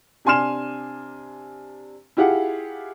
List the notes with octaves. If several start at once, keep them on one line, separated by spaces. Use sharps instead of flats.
C3 D4 G#5 C6 F6 E7
E4 F4 G4 G#4 F#5